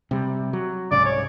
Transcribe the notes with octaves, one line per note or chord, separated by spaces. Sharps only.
C3 G3
F#3
C2 G#2 C#3 D5
C#5